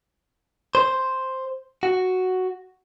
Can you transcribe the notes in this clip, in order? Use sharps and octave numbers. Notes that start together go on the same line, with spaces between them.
C5
F#4